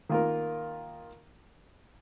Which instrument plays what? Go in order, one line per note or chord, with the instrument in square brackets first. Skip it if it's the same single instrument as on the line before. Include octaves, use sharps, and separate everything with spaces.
[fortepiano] D#3 A#3 F4 A#4